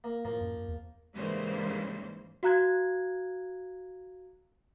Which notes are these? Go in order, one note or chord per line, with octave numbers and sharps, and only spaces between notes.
A#3
A2 F3 A#3
F#2
E2
G#2 C#3 E3 G3 A#3 C5
F#4 F5 A#5 F#6 G#6